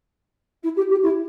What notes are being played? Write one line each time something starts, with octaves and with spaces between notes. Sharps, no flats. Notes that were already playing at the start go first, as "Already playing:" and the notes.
E4
G4
G4
E4